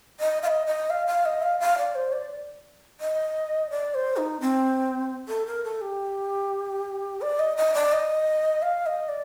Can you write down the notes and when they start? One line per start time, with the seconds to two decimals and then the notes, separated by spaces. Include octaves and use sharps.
0.20 D#5
0.43 F5
0.47 D#5
0.67 D#5
0.90 F5
1.07 F5
1.25 D#5
1.42 F5
1.60 F5
1.78 D5
1.95 C5
2.12 D5
3.01 D#5
3.70 D5
3.94 C5
4.17 D#4
4.41 C4
5.28 A4
5.46 A#4
5.64 A4
5.81 G4
7.22 D5
7.39 D#5
7.57 D#5
7.74 D5
7.92 D#5
8.62 F5
8.86 D#5
9.09 D5